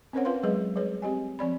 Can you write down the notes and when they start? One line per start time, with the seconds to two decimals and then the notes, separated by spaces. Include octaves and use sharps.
0.13 C4 C#4 A#4 C5 C#5 F#5
0.25 F4 B4 F5 C6
0.43 F#3 G#3 G#4 B4 D#5
0.76 G3 G#4 B4 C#5
1.02 C4 G4 D#5 G#5
1.39 F3 C4 D5 B5